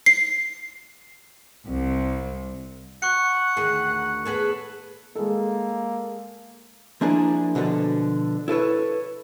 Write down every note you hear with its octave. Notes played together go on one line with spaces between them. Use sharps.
C7
C2
F#5 C#6 F#6 C#7
D2 D#3 G#4
B3 G#4 A4
G#3 A#3 A4
F3 A#3 D4 E4 G#4
B2 D3 F3 A4
E4 A4 B4 C#5